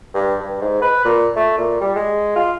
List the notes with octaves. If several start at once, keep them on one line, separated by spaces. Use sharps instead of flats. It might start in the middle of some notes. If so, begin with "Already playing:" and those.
G2
G2
G#2
B4
A#2
A3
A#2
G3
G#3
F4